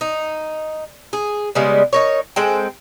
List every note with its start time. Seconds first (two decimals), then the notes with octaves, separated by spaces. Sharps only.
0.01 D#4
1.13 G#4
1.55 C#3 G3 G#3 B3
1.93 D#4 A#4 C#5
2.36 G#3 C4 A4 G5